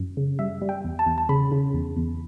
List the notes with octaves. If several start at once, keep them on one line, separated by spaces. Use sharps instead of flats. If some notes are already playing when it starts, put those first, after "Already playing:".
Already playing: F#2
C#3
G3 E5
G3
G5
E2
A5
E2
A5
C#3 B5
C#3
E2
E2